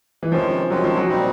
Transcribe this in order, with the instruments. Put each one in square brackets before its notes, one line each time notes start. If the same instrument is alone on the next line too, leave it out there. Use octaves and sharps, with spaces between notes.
[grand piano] E3
[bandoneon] C3 D#3 G#3 C#4 [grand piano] F3
[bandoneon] C3 D#3 G#3 C#4 [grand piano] F#3
[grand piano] F3
F#3
[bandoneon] A#2 G3 C4 D#4